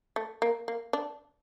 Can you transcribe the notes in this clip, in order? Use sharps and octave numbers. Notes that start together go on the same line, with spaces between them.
A3
A#3
A#3
D4